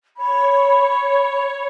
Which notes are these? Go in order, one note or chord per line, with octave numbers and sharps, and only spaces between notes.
C#5 B5